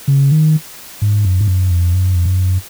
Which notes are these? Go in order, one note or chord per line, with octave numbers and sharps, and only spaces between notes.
C#3
D#3
G#2
F#2
G#2
F#2
F2
F#2
F2
F#2